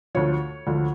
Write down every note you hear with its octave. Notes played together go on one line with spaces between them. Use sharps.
D2 D3 F3 C#5
D2 D3 F3